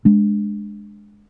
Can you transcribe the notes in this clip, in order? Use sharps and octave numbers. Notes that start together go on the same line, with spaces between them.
G#3 D4